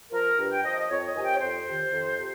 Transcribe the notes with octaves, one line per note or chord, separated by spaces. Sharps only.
F3 A#4
G2
G5
F3 D#5
D#5
F2 C#5
D#5
C3 D#3 G#5
G5
C#5
F2 C5
C3 D#3
F2
C3